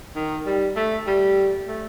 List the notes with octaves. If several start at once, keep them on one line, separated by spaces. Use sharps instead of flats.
D#3
G3
A3
G3
A3